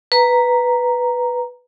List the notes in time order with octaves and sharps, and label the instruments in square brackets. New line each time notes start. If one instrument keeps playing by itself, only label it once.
[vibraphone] B4 A#5